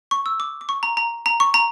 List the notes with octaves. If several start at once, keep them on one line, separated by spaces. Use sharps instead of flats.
C#6
E6
D6
D6
C#6
A#5
A#5
A#5
C#6
A#5